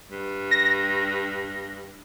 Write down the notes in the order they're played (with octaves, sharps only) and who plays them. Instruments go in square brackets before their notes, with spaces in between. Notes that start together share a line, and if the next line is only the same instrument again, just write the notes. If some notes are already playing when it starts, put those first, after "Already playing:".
[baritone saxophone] G2
[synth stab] A#6